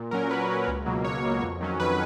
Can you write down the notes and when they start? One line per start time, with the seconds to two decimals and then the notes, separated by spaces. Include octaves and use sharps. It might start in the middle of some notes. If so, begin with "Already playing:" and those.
Already playing: A#2
0.11 F#3 C#4 A#4
0.30 A#2 B4
0.50 F#3 C#4
0.68 C#2
0.86 B2 F#3 A#3
1.04 C#2 C#5
1.23 B2 F#3 A#3
1.42 F2
1.61 D#3 F#3 C#4
1.80 F2 B4